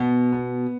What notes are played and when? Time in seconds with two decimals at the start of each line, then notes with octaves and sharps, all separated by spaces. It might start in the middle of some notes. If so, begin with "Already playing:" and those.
Already playing: B2 B3
0.32 B3